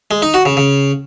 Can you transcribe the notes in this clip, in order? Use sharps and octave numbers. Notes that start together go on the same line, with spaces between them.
G#3
D#4
F#4
C#3
C#3